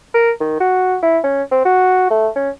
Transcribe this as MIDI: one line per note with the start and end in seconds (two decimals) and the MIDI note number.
0.14 0.31 70
0.41 0.58 51
0.60 0.97 66
1.03 1.19 64
1.24 1.43 61
1.51 1.61 60
1.65 2.07 66
2.10 2.28 57
2.36 2.50 61